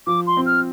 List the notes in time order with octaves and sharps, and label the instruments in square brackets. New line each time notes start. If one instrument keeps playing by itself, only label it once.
[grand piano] F3 [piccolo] D6
[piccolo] C6
[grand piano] C4
[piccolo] F6